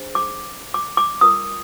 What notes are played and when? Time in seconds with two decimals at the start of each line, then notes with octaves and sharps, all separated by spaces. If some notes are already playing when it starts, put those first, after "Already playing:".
Already playing: D4 G#4 C5
0.15 D6
0.74 D6
0.97 D6
1.21 F4 A#4 D#6